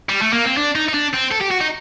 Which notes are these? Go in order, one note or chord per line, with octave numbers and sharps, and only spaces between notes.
G3
A3
A#3
C4
D4
D#4
D#4
D4
C4
A4
G4
F#4
D#4